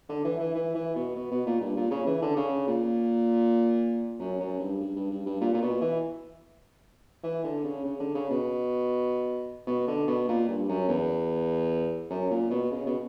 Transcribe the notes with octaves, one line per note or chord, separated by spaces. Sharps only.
D3
E3
E3
E3
E3
B2
B2
B2
A#2
G2
A#2
C#3
E3
D3
C#3
A#2
F#2
F#2
G2
G2
G2
G2
G2
A#2
A#2
B2
E3
E3
D3
C#3
C#3
D3
C#3
B2
B2
D3
B2
A#2
G2
F#2
E2
F#2
A#2
B2
C#3
B2